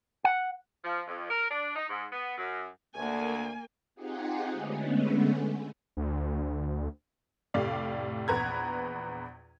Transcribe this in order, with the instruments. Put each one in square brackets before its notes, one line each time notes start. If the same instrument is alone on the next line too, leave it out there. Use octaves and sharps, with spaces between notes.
[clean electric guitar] F#5
[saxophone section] F3
F2
A#4
D4
D#4
G#2
B3
F#2
[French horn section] D2 [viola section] A#3 G#5
[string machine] C4 D#4 F4 G4 G#4 F#5
D3 G#3 A3 B3 C#4
[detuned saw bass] D2
[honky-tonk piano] F1 A2 G4 D5 F5
A#1 E2 B4 A#5 G#6